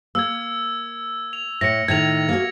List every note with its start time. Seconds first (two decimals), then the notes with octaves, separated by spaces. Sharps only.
0.15 A#3 E6 G#6
1.33 F7
1.61 A2 A#6 C#7
1.88 A2 D#3 G#6 F7
2.29 A#3 F#4